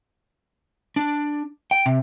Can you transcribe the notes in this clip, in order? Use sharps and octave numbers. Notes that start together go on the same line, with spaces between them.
D4
G5
C3